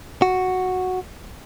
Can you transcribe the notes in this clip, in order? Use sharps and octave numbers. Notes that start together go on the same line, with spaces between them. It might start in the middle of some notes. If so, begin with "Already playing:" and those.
F#4